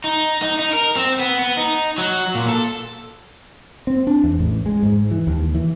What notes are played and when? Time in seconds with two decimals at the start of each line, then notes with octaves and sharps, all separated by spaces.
0.04 D#4
0.42 D#4
0.59 D#4
0.73 A#4
0.96 C4
1.19 B3
1.39 B3
1.57 D#4
1.98 F#3
2.35 A#2
2.49 A4
3.87 C4
4.07 D4
4.24 E2
4.39 A1
4.66 G#3
4.83 G#2
5.11 E3
5.27 D#2
5.54 E3